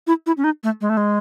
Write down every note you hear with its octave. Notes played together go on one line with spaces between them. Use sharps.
E4
E4
C#4
D#4
A3
G#3
A3
G#3